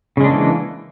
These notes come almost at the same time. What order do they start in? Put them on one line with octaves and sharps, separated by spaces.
C#3 G#3 D4 A#3 E3